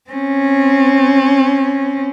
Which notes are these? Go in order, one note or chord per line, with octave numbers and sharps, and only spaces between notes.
C4 C#4